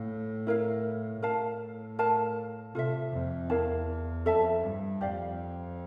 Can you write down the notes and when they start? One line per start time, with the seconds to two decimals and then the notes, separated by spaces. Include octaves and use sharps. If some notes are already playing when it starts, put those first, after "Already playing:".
Already playing: A2 F5
0.47 E4 A#4 F5
1.22 A2 A#4 F5 A5
1.99 A#4 F5 A5
2.74 C3 F4 A4 E5
3.13 F2
3.50 E2 E4 A#4 F5 A5
4.25 F2 A4 E5 A5
4.64 G2
5.01 F2 G4 D5 F5